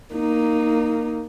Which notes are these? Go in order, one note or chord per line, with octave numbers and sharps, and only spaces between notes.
A#3 D#4